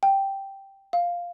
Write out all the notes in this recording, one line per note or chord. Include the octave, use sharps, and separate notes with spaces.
G5
F5